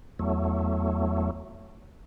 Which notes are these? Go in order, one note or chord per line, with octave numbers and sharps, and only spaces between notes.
E2 F#3 A3